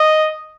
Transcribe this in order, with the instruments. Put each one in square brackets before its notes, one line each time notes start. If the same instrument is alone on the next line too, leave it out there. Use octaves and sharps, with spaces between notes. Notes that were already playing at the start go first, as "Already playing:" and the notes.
Already playing: [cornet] D#5